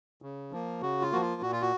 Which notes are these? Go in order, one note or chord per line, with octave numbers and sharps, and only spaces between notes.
C#3
F3 A#3
C#3 F#4
F4
F3 A#3 F#4
F4
A#2 F#4
F4
F#4